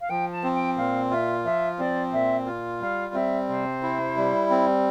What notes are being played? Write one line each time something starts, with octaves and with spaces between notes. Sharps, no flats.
F5
F3 G5
A5
C4
G5
A#2 F5
F4 E5
F3 E5
C4 D5
A#2 E5
F4
G3 F5
C4 E5
C3 C5
E4
G3
C4